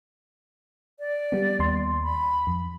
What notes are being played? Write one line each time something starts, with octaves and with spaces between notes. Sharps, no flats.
D5
G3 B3
D#2 C6
B5
F2